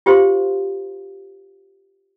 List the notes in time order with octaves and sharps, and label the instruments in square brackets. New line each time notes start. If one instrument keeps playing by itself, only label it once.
[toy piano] F4 G4 C5 F5 C6